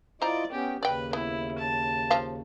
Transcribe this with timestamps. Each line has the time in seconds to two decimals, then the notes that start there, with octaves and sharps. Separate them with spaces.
0.22 E4 F4 C5 D5 D#5 A#5
0.52 B3 C#4 G4 G5
0.83 D#2 C#3 B4 D5 G5
1.13 B3 E4
1.58 A5
2.10 F3 F5